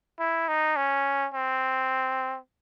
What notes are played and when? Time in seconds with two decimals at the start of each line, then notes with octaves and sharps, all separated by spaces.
0.19 E4
0.48 D#4
0.76 C#4
1.34 C4